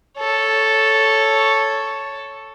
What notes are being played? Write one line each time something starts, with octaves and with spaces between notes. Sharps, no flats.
A4 C#5